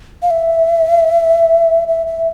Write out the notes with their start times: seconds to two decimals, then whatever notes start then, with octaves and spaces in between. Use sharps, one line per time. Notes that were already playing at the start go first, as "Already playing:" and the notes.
0.22 F5
0.31 E5
1.88 E5
2.07 E5